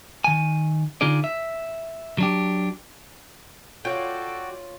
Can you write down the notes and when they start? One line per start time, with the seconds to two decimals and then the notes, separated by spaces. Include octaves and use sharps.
0.24 D#3 G#5
1.01 D3 D#4 F4 G#4 D5
1.24 E5
2.18 F#3 D4 G4
3.85 F4 F#4 A4 C#5 D5 G5